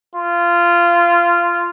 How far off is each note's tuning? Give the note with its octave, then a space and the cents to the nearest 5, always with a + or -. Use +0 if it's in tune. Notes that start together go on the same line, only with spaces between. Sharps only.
F4 -15